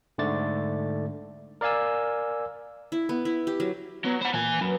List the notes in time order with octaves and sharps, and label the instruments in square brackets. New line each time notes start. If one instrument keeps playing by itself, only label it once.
[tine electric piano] G#2 D3 A3 D5 A6
A#4 D5 F5 G#5 E6
[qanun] E4
B3
E4
G4
F#3
[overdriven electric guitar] F#3 [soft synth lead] B3
[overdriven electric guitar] C5 F#5 [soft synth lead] B5
[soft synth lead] A#2 [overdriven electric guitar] E3 G#5
[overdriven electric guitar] F#2 [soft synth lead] B4